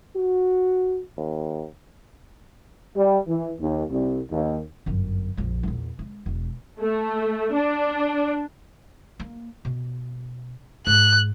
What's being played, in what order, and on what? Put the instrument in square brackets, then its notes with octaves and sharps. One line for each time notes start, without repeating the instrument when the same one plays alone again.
[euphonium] F#4
D#2
[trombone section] G3
E3
D#2
C2
D#2
[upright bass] G1 F#2
A#1 F2
E2 A#2
G#3
E1
[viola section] A3
D4
[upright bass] A#3
B2
[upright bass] G#2 [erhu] F#6